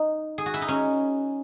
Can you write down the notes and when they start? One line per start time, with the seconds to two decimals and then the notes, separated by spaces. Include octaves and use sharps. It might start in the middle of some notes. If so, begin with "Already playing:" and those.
Already playing: D#4
0.38 G#4
0.46 F#4
0.54 E4
0.62 D#4
0.68 C#4